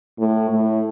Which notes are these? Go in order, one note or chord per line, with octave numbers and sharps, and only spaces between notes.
A2
A2